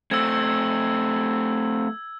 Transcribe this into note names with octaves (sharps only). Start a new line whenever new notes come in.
A3 C4 E6 G#6